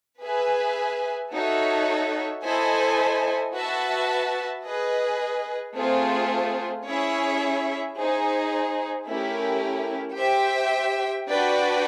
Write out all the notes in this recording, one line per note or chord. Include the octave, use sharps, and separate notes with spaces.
G#4 B4 E5 G#5
D#4 F#4 A4 C#5 E5
E4 A4 C5 D#5 G#5
F#4 B4 E5 A5
G#4 B4 D#5
A3 C4 F4 G#4 C5
C#4 E4 G#4 C#5 E5
D#4 G#4 C5
A3 C#4 E4 G4 A#4
G4 C5 E5 G5
D4 F#4 B4 D5 G5